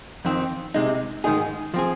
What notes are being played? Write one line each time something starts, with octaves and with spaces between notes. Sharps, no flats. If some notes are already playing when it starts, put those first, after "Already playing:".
F2 D#3 C4
C3 G#3 D#4
G#2 D#3 G#3 D#4 G#4
F3 C4 G#4